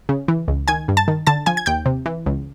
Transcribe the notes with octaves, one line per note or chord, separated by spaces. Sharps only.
C#3
E3
C#2
D#3 G#5 G#6
G2
A5 A6
D#3
D3 A5 A6
F3 G#5 G#6
G#6
D#2 G5 G6
C3
E3
C#2